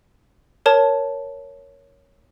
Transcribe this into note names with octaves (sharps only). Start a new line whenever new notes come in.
A#4 C#5 A5